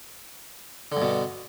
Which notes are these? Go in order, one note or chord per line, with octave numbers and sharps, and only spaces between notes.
G2 B2 D3